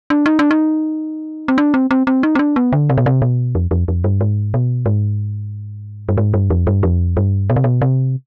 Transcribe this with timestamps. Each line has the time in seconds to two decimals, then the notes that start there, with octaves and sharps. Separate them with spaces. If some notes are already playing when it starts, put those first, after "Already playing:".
0.10 D4
0.26 D#4
0.39 D4
0.51 D#4
1.48 C4
1.58 D4
1.74 C4
1.91 C4
2.07 C4
2.23 D#4
2.35 C4
2.39 D4
2.56 B3
2.73 D3
2.90 C3
2.98 B2
3.06 C3
3.22 B2
3.55 F2
3.71 F2
3.88 F2
4.04 G2
4.21 G#2
4.54 B2
4.86 G#2
6.09 G2
6.18 G#2
6.34 G2
6.50 F2
6.67 G2
6.83 F2
7.17 G2
7.50 B2
7.56 C3
7.64 B2
7.82 C3